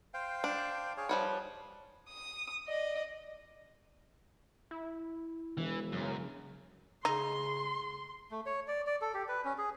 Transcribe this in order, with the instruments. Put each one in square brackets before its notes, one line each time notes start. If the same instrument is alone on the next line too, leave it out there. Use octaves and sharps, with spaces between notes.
[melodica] C5 F5 G5
[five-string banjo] D4
[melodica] G#4 C#5 F5
[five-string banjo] F3 G3 C#5 [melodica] B4
[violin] D#6
D5 D#5
[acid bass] E4
[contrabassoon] E1 [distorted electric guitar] E3
[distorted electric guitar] F#2 [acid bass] C#3
[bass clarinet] C#3 [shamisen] D#4 [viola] C6
[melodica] A3
C#5
D5
D5
A4
G4
B4
C#4
G#4